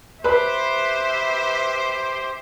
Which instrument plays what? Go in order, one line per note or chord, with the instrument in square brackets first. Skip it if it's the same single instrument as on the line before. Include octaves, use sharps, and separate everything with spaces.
[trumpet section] G4 C5 [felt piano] B4 B5 [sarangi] E5